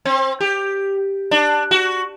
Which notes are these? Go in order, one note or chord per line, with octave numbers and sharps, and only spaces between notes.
C4
G4
D4
F#4